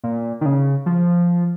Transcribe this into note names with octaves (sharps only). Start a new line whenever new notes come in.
A#2
D#3
C#3
F3